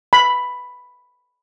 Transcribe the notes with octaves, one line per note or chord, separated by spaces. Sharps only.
B5